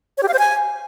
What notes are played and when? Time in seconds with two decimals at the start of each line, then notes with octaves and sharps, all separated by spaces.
0.18 C#5
0.23 G4
0.28 F5
0.34 C5
0.39 G#5